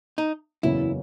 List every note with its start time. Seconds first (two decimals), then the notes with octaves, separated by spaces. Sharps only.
0.18 D#4
0.63 F#1 E2 C#3 F#3 C#4 E4